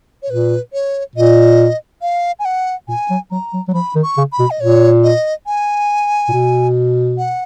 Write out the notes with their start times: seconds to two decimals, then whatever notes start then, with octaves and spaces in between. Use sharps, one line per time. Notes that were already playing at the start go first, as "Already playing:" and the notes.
0.23 C#5
0.30 A#2 B4
0.73 C#5
1.16 A#2 D#5
2.02 F5
2.39 G#5
2.45 F#5
2.88 A#2 G#5
3.10 F#3
3.31 F#3 A#5
3.53 F#3
3.68 F#3
3.74 F3 B5
3.95 D#3
4.03 C#6
4.18 C#3
4.32 B5
4.39 B2
4.51 D#5
4.61 A#2 C#5
5.04 D#5
5.47 G#5
6.29 A#2
6.33 B2
7.18 F#5